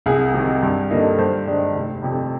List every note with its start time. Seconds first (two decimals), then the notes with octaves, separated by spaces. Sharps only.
0.06 C2 G#4
0.34 C3 D#3
0.63 G2
0.90 D3 G3 A#3 D#4
1.18 G2 C5
1.47 D#3 G#3 D4
1.75 F1
2.03 F2 C3